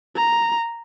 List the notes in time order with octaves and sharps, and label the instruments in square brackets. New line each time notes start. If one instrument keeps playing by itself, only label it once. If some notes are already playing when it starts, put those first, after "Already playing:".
[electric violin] A#5